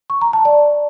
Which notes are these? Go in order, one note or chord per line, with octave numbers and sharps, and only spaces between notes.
C#6
A#5
A5
D5